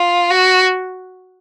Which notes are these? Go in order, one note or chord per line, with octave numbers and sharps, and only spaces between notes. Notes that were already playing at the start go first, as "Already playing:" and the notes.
Already playing: F4
F#4